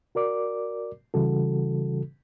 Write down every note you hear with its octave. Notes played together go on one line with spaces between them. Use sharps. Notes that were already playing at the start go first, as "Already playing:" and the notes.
F#4 A#4 D5 D6
C#3 E3 G3 F#4 A4